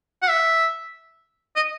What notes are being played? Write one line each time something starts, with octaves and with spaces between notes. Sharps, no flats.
F#5
E5
D#5